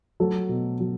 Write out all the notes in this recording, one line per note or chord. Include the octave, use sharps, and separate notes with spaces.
F#3 A4
B2
F#3